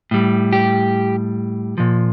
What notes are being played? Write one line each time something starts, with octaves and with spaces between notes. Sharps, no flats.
A2 G3
G4
A#2 F3